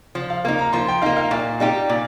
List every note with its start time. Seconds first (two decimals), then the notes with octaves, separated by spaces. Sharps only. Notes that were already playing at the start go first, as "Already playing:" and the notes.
0.15 F3
0.30 F5
0.45 A#3 D#4 F5
0.59 A#5
0.73 F3 C6
0.88 G5
1.02 A#3 D#4 F5
1.17 F5
1.31 A#2 F5
1.60 G3 D#4 G4
1.89 A#2